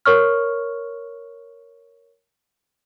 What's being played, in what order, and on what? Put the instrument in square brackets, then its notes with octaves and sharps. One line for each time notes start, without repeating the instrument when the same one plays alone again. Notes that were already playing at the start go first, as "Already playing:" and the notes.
[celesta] A#4 C#5 C#6 F6